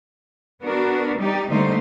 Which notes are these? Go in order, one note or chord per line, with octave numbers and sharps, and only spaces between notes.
B3 D4 F#4 A#4
G3 D#4 G4 D5
D3 G3 A3 A#3 D#4 C5